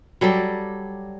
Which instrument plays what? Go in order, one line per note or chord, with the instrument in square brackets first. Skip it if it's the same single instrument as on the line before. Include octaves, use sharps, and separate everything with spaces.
[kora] F#3 G3 A4 D5